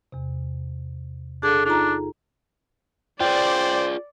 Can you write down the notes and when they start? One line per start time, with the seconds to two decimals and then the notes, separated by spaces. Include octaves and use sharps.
0.12 E2 C3
1.43 D4 G#4 A4
1.66 D4 D#4 F4 A#5
3.21 F4 G#4 C5 D5 G5